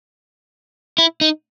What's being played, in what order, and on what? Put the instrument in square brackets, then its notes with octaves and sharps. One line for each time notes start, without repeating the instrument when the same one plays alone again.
[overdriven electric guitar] E4
D#4